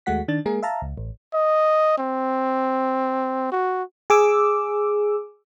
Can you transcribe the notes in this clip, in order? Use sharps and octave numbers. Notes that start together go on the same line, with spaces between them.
D#2 G#3 A3 F#4 F#5 B6
D#3 D4 A6
G#3 A#3 G#4 A#4
E5 F5 A5 A#5
C#2
A1
D#5
C4
F#4
G#4 D6 E6